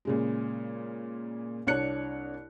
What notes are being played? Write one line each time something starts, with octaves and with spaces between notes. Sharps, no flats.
A#2 C#3 G#3
C2 D4 C#5 F#6 C#7